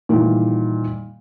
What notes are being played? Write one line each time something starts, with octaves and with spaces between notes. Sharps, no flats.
A#2 D#3 E3 G3